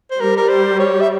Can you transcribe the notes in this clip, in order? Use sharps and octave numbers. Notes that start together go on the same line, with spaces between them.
C5
G3 A#4
A#4
C5
C#5
E5